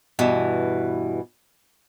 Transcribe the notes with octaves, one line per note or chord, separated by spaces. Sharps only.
G2 B2 E3